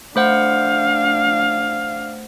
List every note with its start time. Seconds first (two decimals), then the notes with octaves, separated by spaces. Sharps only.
0.16 A3 D4 C5 F5 F#5